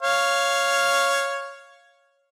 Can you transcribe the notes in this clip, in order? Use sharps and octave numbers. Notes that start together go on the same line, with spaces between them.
C#5 F5